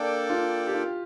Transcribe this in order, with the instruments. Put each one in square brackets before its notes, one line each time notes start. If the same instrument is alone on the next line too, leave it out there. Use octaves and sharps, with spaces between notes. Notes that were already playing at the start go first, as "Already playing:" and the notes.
Already playing: [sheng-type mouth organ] A#3 D4 A4 D5 G5
[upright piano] F4
G4
F4